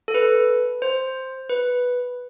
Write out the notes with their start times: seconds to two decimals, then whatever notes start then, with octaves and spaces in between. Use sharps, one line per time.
0.08 A4
0.14 B4
0.82 C5
1.49 B4